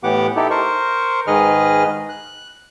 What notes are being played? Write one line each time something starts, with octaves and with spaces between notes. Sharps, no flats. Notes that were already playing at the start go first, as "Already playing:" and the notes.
A2 E3 B3 G4 F#5 D6
D#4 E4 G4 A4
A#4 C5 C#6
G#2 D#3 G#4 B4 D#5 F6
F#6